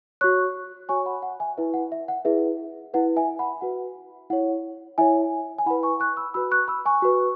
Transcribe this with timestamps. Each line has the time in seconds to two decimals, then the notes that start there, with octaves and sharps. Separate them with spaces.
0.21 F#4 C#5 C#6 F#6
0.89 F#4 C#5 G#5 C#6
1.06 F#5 B5
1.22 F#5
1.40 E5 G#5
1.57 E4 B4 E5
1.74 F#5
1.92 E5
2.08 F#5
2.25 E4 G#4 B4 E5
2.94 E4 B4 F#5
3.16 E5 G#5
3.39 F#5 B5
3.61 F#4 B4 F#5
4.30 E4 C#5 F#5
4.98 E4 C#5 E5 G#5
5.58 G#5
5.66 E4 F#5 B5
5.70 B4
5.83 G#5 C#6
6.00 C#6 F#6
6.17 B5 E6
6.34 F#4 B4 B5 E6
6.51 C#6 F#6
6.68 B5 E6
6.86 G#5 C#6
7.02 F#4 B4